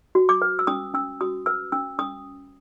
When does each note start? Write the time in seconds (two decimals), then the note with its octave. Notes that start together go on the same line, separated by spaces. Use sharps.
0.15 F#4
0.29 D6
0.42 B4
0.59 E6
0.67 C#4 D#6
0.94 C#4 E6
1.21 F#4 D#6
1.46 B4 E6
1.72 C#4 E6
1.99 C#4 D#6